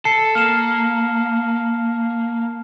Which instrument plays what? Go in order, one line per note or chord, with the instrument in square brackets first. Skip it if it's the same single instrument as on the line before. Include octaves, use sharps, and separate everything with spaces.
[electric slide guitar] A4 [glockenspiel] A5 C7 C#7
[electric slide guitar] A#3 [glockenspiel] F6 E7